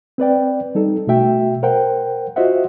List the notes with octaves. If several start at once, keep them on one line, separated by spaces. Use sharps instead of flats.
C4 B4 D5 G5
G3 D#4 A4
B2 A3 F#4 E5 G5
A#4 C5 F#5 G5
F4 F#4 C5 D#5 E5 F#5